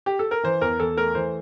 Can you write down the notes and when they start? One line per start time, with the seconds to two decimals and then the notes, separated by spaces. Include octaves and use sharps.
0.06 G4
0.19 A4
0.31 A#4
0.44 E3 C5
0.61 E2 A#4
0.79 E2 A4
0.97 A3 A#4
1.15 E3 C5